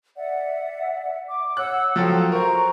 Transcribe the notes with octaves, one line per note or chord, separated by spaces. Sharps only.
D5 E5 F#5
D6
C#5 F#5 E6 F#6
F3 F#3 F4 A4 G5
A#4 C5 A#5 C#6